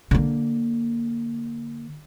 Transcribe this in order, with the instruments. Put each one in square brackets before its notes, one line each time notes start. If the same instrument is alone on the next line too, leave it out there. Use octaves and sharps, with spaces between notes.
[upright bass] D3 A#3